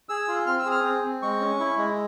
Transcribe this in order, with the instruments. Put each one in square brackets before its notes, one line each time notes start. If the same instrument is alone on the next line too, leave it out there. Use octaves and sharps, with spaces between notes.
[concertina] G#4 E6
F4
C4 F6
E6
G#4
F6
C4
C4
G#3 C#6
C#4
E4
G#3